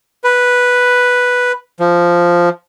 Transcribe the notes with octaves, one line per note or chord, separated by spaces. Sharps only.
B4
F3